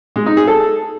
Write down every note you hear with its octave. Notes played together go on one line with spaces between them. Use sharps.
G#3
D#4
G#4
A4